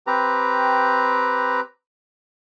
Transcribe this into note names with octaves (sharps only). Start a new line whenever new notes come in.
C4 G4 B4 A#5